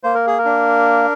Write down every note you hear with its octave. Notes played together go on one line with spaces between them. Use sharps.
A#3 C5
A#4
G#4
A#4
D4